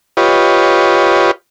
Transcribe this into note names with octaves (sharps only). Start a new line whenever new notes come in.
F4 G4 B4 C#5 D#5